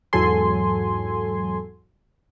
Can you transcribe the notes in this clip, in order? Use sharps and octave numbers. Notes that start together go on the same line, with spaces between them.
E2 G#2 F#3 A4 G#5 C6